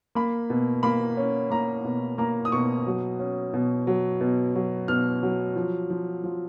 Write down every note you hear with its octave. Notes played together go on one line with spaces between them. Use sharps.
A#3 B5
B2
A#3 B5
C#4
A#3 A#5
B2
A#3 A#5
D#6
B2 C#6
F#3
C#4
B2
F#3
B2
F#3
B2 F6
F#3
F3
F3
F3